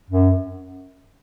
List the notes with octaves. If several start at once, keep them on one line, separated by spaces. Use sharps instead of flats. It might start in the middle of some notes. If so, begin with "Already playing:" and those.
F#2